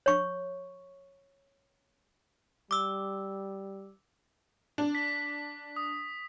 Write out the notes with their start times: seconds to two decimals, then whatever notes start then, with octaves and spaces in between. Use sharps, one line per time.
0.06 C#5 C#6
2.71 G3 D6 E6
4.78 D4
4.95 B6
5.76 D#6